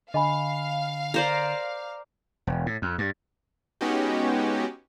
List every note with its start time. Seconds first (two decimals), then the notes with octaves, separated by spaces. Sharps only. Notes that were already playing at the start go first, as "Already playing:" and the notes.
0.14 D3 D#5 F5 G#5 B5
1.14 A#4 C5 D5
2.47 E1
2.66 A2
2.82 F2
2.98 G2
3.81 G#3 B3 C#4 D#4 F#4 G4